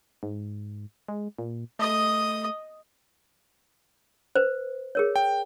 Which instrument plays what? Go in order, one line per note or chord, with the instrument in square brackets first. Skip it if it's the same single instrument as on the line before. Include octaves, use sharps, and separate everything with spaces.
[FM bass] G#2
G#3
A#2
[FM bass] A3 [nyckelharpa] D#5 D#6
[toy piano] B4 C5
G#4 A#4 C#5
[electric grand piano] G5